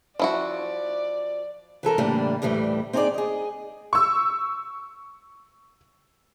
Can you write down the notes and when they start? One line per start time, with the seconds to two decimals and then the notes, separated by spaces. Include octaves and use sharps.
0.20 F3 E4 F#4 D5
1.83 E3 F3 A4 A#4
1.98 A2 C#3 E3 G3 A#3 D4
2.42 D2 A2 E3 G3 A3
2.93 C4 D#4 G#4 C#5 D5
3.14 G#4 D#5
3.93 C#6 E6